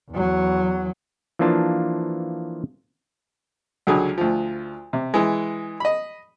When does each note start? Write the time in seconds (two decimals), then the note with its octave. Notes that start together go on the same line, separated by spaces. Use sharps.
0.11 E2 F#3
1.39 E3 F3 A#3 D4 F4 A5
3.87 C#2 D3 F#3 G#4
4.18 D2 F3
4.93 C3
5.14 E3 G#3
5.80 D#5 B5